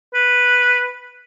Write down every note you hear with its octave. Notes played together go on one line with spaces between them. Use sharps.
B4